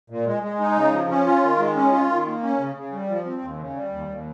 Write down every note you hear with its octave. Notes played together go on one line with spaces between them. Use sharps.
A#2
G#3
G#3
D#4
C#3
F3
C#4
F4
D#3
G#3
C#4
F4
D#3
A#3
C#4
C#3
C#3
G3
F3
C4
D#2
C#3
G3
D#2
D#2